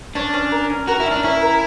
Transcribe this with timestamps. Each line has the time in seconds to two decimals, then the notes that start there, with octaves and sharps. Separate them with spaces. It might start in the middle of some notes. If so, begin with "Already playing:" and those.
0.15 C#4 D4
0.33 C#4
0.52 A#4
0.70 C#4
0.87 F#4 A#4
1.00 E4
1.06 C#4
1.11 D4
1.23 C#4 E4
1.42 A#4